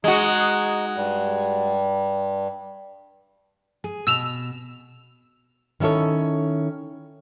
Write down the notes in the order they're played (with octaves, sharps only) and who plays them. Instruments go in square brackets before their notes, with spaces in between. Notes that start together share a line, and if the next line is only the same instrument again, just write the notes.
[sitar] G#3 F#4 [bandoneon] D#4
[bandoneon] G2 G3
[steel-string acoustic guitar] G#4
[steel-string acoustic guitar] B2 [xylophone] E6 E7 F7
[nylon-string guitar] D#3 C#4 E4 A4 C#5